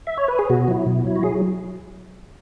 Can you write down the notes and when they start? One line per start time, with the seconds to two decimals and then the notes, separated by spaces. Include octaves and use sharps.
0.07 E5
0.17 C#5
0.28 B4
0.39 G#4
0.50 B2 F#4
0.68 F#3 E4
0.86 B2
1.05 F#3 E4
1.16 F#4
1.23 F#3 G#4